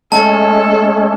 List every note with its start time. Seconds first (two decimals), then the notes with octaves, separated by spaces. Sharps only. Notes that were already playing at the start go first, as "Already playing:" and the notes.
0.12 G#3 A3 C#4 A4 A5